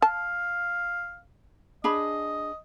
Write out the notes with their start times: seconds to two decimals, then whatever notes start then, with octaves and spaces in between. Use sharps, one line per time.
0.02 F5 A5
1.84 D4 G#4 D#5 B5